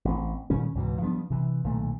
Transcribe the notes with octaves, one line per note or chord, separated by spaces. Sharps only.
A1 C4
A#2 D#3 G3 C#4
C#2 G#2 B2 E3
F3 G3 B3 D4
C3 E3
B1 A#2 D#3 A3